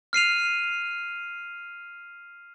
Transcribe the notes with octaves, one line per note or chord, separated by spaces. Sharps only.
F6 C7 D#7 F7